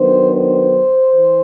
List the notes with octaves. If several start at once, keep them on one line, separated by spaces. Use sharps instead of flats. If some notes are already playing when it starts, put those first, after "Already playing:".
Already playing: D#3 F#3 B3 D4 C5
C5
E3